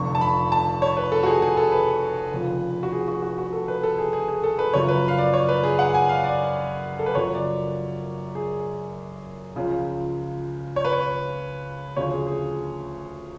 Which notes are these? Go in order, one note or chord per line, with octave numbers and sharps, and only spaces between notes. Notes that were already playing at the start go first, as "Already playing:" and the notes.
Already playing: F1 F2 D3 F3 C#6
A5
B5
A5
C#5
B4
A4
F#4
G#4
G#4
A4
B4
F1 F2 C#3 F3
F#4
G#4
F#4
F#4
F#4
A4
B4
A4
G#4
G#4
G#4
A4
B4
F#1 F#2 F3 C#5
B4
F5
D5
C#5
B4
G#4
F#5
G#5
F5
D5
A4
B4
F#1 F#2 F3 C#5
D5
G#4
C#2 C#3 F3
C#5
B4
C#5
D2 C#3 F3 C#5
G#4
G#4